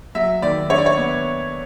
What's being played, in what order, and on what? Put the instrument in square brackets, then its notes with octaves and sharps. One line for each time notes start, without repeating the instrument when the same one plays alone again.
[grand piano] F#3 E5
D#3 D5
D4 C#5
D5
C#5
B3